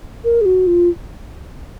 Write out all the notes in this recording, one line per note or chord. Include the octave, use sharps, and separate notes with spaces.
A#4
G#4
F#4
F4